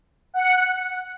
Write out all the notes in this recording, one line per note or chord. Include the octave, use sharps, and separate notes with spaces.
F#5